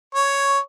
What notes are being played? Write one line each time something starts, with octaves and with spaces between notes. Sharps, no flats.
C#5